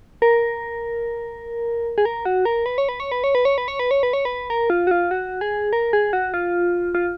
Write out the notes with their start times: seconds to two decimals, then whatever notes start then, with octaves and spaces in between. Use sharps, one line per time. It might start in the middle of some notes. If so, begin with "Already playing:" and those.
0.22 A#4
1.98 G#4
2.05 A#4
2.25 F#4
2.45 A#4
2.66 B4
2.78 C#5
2.89 B4
3.00 C#5
3.12 B4
3.24 C#5
3.35 B4
3.45 C#5
3.58 B4
3.68 C#5
3.79 B4
3.91 C#5
4.03 B4
4.13 C#5
4.25 B4
4.50 A#4
4.70 F4
4.87 F#4
4.91 F4
5.11 F#4
5.41 G#4
5.73 A#4
5.93 G#4
6.13 F#4
6.34 F4
6.95 F4